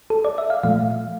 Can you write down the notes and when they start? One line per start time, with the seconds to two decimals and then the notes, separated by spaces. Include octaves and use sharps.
0.10 A4
0.25 D5
0.38 E5
0.50 F5
0.63 A#2 F3 A3 F5